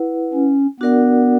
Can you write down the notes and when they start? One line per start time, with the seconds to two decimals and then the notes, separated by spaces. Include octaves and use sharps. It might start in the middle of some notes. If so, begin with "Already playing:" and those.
Already playing: E4 B4 F#5
0.33 C#4
0.80 B3 D4 F#4 A#4 D5 F#5